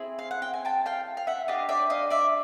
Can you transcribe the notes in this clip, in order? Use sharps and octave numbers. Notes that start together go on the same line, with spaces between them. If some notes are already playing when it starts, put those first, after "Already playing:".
Already playing: C4 E4 G#4
F5
F#5
G5
G#5
G5 A5
F5 G5
F5
E5 F#5
D4 G4 D#5 F5
D5 E5
D#5 F5
D5 E5